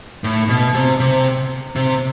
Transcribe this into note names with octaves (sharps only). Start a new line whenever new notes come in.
A2
B2
C3
C3
C3